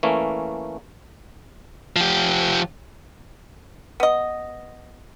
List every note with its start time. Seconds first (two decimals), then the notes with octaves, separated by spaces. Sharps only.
0.03 E3 A3 A#3 C#4
1.96 F3 G4
4.00 B3 D#5